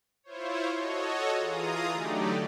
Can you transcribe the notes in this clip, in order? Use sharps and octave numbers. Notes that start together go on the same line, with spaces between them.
E4 F4 C5 C#5
F#4 A4 C#5 D#5
E3 F4 G#4 A#5 D#6
D3 F#3 A3 D#4 G4 D5